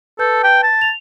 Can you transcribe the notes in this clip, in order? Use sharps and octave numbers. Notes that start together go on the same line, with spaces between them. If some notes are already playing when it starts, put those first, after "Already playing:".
A4 B4 A5 G6
G5
A5
F7